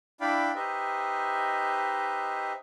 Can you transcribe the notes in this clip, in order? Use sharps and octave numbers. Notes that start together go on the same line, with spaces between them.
D4 E4 D5 F5 G5 B5
D#4 G4 B4 C5 D#5 E5